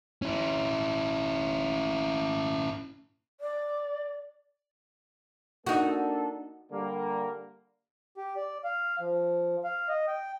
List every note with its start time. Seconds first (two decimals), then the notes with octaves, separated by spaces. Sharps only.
0.22 C#4 E4
3.40 D5
5.67 A#3 D4 D#4 F#4 A4
6.72 D3 G3 A#3
8.17 G4
8.37 D5
8.64 F5
9.00 F3
9.64 F5
9.89 D#5
10.08 G5